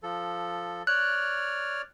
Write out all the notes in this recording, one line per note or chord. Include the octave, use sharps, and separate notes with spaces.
F3 A4
C#5 D5 F6 F#6